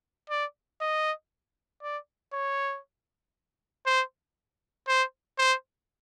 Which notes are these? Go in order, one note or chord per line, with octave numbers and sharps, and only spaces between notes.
D5
D#5
D5
C#5
C5
C5
C5